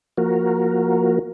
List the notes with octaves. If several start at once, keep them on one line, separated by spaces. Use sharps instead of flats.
F3 A#3 F#4 A#4